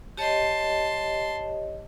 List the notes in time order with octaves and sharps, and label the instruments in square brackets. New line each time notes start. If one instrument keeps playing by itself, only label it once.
[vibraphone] G4 C#5 D#5 [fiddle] A5 C6